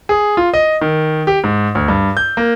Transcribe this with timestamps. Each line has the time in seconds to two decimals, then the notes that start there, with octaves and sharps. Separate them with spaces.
0.09 G#4
0.37 F4
0.54 D#5
0.81 D#3
1.27 G4
1.44 G#2
1.75 D2
1.88 G2
2.17 G6
2.37 A#3